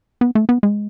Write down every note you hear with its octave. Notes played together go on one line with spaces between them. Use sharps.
B3
A3
B3
G#3